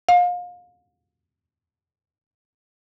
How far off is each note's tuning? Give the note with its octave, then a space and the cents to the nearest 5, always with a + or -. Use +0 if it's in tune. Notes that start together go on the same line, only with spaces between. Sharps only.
F5 +30